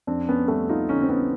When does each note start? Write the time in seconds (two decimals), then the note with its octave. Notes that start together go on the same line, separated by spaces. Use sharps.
0.07 F2 C4 D4
0.29 B3 C#4
0.48 G3 A3 B3
0.69 D#4 F4
0.89 D3 C#4 D#4
1.02 C4
1.09 B3 C#4